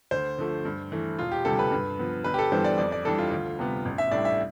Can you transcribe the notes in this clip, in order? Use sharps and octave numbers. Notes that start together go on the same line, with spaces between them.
D2 C5
D3 F3 A3
G2
E3 A3
E1 F4
G4
D2 C3 G3 A4
B4
G2
F3 B3
G1 B4
G4
A4
G2 E3 G3 B3 C5
D5
F2 D5
D5
E3 G3 D4 A4
F4
D2
C3 G3 B3
A1
E5
A2 G3 D4 D5
E5